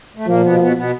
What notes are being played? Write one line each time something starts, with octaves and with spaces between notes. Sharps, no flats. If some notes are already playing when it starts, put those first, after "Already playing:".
A3
A#2 F3 A#3
B2 B3
A#3
B2 B3
B2 B3